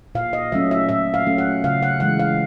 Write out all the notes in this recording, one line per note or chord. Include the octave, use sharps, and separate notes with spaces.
A#2 F5
D#5
F#3 A3 C#4 E5
E5
A#2 E5
F5
F#3 A3 C#4
F#5
C#3 F5
F#5
E3 G#3 F#5
F5